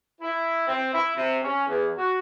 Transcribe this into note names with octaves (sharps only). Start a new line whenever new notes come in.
E4
C4
E4
C3
C#4
E2
F#4